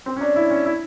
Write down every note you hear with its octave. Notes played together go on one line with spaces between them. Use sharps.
C4
C#4
D4
E4
C#4
E4